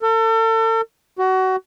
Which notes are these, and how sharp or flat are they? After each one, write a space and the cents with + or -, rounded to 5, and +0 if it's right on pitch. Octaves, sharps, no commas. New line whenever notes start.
A4 +40
F#4 +25